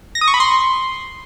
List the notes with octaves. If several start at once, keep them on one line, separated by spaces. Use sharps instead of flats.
A#6
D#6
C#6
B5
C6